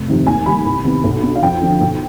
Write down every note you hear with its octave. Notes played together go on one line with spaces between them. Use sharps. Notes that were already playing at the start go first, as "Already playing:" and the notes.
Already playing: F1
F2 C3 D#3
D#2 G#5
D#3 G3 B5
C2
C3 D#3 B3
B1
B2 B3 D4
F5
F2 G5
D3 F3
B1